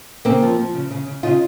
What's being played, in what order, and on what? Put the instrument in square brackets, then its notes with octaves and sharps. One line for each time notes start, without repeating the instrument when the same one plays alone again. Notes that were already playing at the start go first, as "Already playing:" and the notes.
[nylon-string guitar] C#3 A#3 C4
F3
F3
C#3
C#3
C#3
C#3 D#4 F4